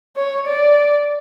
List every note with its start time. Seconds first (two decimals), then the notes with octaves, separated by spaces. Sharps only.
0.17 C#5
0.48 D5